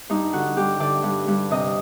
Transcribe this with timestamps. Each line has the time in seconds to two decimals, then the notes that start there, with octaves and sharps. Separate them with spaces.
0.09 G2 D#4
0.33 D3 F#4
0.57 G2 G4
0.80 D3 D5
1.03 G2
1.28 G2
1.51 C3 D#5